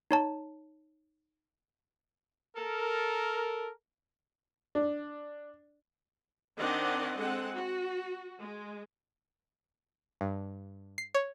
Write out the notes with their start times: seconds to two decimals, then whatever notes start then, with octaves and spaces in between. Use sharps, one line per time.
0.11 D#4 C#5 A5
2.56 A4 A#4
4.75 D4
6.59 D#3 C4 D4 D5 D#5 F#5
7.19 G#3 C4 A4 F#5
7.56 F#4
8.40 G#3
10.21 G2
10.98 C7
11.15 C#5